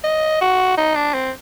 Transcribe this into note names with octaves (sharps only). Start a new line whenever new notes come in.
D#5
F#4
D#4
D4
C4